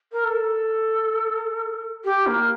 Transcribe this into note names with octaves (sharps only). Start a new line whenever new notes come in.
A#4
A4
G4
A#3